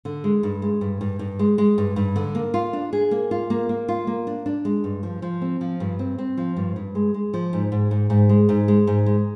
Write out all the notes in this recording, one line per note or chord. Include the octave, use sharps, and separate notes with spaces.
D3
G#3
G2
G#3
G2
G2
G2
G#3
G#3
G2
G2
D3
A#3
F4
D4
G#4
A#3
F4
A#3
A#3
F4
A#3
D4
D4
G#3
G2
F3
F3
C4
F3
G2
C4
C4
F3
G2
G2
G#3
G#3
F3
G#2
G#2
G#2
G#2
G#3
G#2
G#3
G#2
G#3